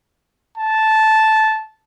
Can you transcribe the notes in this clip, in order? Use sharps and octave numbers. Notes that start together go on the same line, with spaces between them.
A5